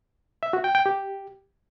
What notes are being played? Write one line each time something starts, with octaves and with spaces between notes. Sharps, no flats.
E5
F#4
G5
G5
G4